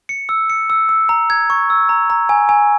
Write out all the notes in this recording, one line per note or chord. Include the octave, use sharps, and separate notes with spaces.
C#7
E6
C#7
E6
E6
A#5
G#6
C#6
E6
A#5
A#5
G#5
G#5